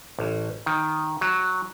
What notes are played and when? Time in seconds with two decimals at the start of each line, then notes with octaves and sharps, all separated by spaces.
0.19 A1
0.66 D#3
1.21 F#3